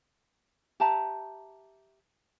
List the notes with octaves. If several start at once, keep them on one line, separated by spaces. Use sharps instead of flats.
G4 E5 A5 A#5